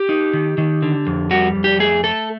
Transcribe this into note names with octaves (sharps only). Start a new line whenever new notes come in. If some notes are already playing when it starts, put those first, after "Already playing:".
Already playing: G4
D#4
D#3
D#3
D3
F2
G3 F#4
F2
G4
A3 G#4
A3 A4